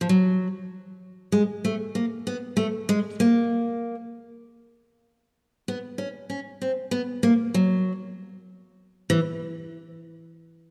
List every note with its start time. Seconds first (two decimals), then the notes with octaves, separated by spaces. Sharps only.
0.01 F3
0.09 F#3
1.32 G#3
1.65 A3
1.95 A#3
2.27 B3
2.57 A3
2.89 G#3
3.20 A#3
5.68 B3
5.98 C#4
6.30 C#4
6.61 C4
6.91 B3
7.23 A#3
7.54 F#3
9.10 E3